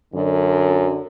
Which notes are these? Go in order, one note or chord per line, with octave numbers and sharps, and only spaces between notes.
F#2 D3